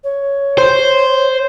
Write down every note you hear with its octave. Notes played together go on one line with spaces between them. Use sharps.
C#5
C5